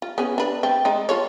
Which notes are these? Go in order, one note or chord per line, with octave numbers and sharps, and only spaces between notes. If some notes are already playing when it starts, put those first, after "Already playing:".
F4
B3 C#4 G#4
D4 B4
A3 C4
G#3 A3 D#4
F4 A4 C#5